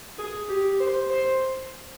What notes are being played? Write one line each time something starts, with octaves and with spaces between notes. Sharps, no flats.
G#4
G4
C5
C5